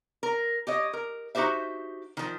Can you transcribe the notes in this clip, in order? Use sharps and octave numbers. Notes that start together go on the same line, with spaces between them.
A#4
G4 C#5 D#5
A#4
D#4 F#4 G4 C5 E5
D#3 F3